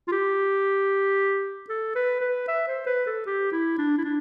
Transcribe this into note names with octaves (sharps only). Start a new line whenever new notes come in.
F4
G4
A4
B4
B4
E5
C5
B4
A4
G4
E4
D4
E4
D4